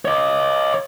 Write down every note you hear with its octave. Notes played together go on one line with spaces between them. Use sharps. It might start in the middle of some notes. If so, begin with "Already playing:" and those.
C#5 D#5